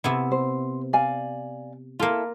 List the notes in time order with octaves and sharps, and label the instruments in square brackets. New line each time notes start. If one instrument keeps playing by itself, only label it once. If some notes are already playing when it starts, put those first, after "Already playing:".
[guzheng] C3 B3 E4
[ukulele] C5
D5 F5 G#5
[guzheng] A#3 F4 [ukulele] E4 A4